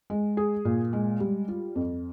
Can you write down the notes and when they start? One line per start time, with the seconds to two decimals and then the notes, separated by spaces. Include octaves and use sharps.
0.10 G#3
0.37 G#4
0.65 A#2
0.93 G#3
1.20 G3
1.48 F4
1.75 F2